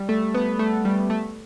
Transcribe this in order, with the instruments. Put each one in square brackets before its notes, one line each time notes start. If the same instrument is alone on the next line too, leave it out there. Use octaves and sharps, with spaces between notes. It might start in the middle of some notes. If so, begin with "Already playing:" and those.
Already playing: [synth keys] G3
A3
B3
A3
G3
A3